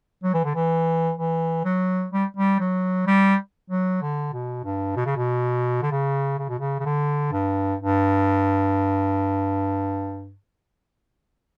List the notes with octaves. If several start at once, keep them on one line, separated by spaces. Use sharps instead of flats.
F#3
E3
D3
E3
E3
F#3
G3
G3
F#3
G3
F#3
D3
B2
G2
B2
C#3
B2
D3
C#3
C#3
B2
C#3
C#3
D3
G2
G2